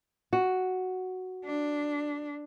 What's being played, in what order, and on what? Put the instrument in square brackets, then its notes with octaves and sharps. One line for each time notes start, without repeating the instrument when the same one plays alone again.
[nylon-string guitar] F#4
[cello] D4